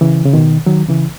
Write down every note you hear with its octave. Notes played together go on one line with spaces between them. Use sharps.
C#3 E3
C#3
B2 D#3
D#3 F#3
C#3 E3